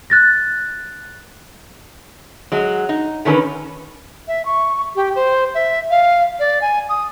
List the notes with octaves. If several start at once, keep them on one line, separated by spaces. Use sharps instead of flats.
F#6 A6 A#6
F#3 G#3
D#4
D3 D#3 C#4 G#4 B4
E5
C#6
G4
C5
E5
F5
D5
G#5
D#6